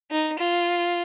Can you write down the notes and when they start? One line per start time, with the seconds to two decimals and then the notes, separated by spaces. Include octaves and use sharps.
0.11 D#4
0.39 F4